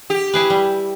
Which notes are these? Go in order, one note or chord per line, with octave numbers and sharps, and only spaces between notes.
G4
E4 G#4 B4
G3